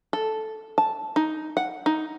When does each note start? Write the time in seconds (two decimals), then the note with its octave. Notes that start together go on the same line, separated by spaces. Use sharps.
0.13 A4
0.78 A5
1.16 D#4
1.57 F#5
1.86 D#4